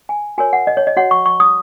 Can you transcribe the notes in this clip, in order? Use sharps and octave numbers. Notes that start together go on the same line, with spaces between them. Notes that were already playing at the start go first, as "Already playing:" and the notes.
G#5
F#4 A#4 C#5 G#5
F#5
D#5
C#5
D#5
F#4 C#5 F#5
C#6
C#6
D#6